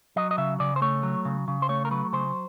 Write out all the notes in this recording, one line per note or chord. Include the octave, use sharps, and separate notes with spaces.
F#3 D#5
D#5
C#3 E5
C#3 D5
C5
A3 C#5
F#3
C#3
C#3
C5
A3 C#5
A#4
F#3 B4
C#3 C5